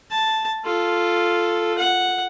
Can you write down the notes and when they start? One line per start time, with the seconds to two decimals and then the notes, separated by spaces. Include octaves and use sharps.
0.10 A5
0.64 F4 A4
1.78 F#5